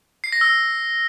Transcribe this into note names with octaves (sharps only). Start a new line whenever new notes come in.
C7
A#6
E6